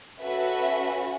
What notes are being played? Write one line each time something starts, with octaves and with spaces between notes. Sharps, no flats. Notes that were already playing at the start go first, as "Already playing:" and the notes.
C#4 F#4 A4 B4 E5